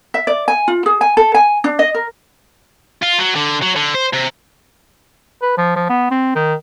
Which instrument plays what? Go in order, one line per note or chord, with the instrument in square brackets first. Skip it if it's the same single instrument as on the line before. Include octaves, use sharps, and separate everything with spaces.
[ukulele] E5
D5
G#5
F4
G#4
G#5
A4
G#5
D4
D#5
A#4
[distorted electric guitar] F4
F#3
D3
F#3
D3
C5
C3
[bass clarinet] B4
F3
F3
B3
C4
D#3